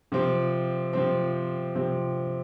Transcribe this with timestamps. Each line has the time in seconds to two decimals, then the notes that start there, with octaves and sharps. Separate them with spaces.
0.12 C3 F3 C4
0.93 C3 F3 C4
1.75 C3 F3 C4